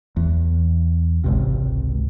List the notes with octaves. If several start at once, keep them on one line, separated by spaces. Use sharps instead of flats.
E2
G#1 C#2 C3